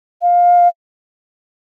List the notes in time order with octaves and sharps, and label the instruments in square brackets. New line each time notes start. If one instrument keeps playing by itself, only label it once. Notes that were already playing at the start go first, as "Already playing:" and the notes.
[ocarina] F5